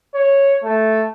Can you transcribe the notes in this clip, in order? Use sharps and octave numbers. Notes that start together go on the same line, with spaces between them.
C#5
A3